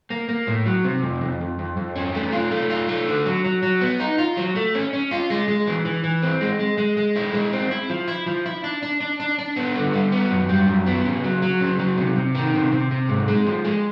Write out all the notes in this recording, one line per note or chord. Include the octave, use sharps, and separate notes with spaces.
A#3
A#3
A2
F#3
C3
F2
F2
F2
F2
F2
C#4
A3
F4
A3
F4
A3
D3
F#3
F#3
F#3
B3
D#4
F4
F#3
A3
C#4
C#4
F4
G#3
G#3
E3
E3
E3
C4
G#3
G#3
G#3
G#3
E4
G#3
C4
E4
F3
E4
F3
E4
D4
D4
D4
D4
D4
B3
D3
G3
B3
F#2
G3
F#2
B3
C#3
F#3
F#3
C#3
F#3
C3
C3
D#3
C3
C3
C3
G#2
G#3
F3
G#3